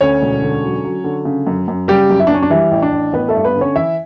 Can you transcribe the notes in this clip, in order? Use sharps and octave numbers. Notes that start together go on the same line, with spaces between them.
D2 C#4 C#5
E1
D3
F#3
F#3
D3
C#3
F#2
F#2
C#3 G3 G4
F#2
E4
D4
F#2 C#4
D4
E3 G3 E4
A1
D4
A1
A1 B3 B4
A3 A4
G2
B3 B4
D3
C#4 C#5
E3 E4 E5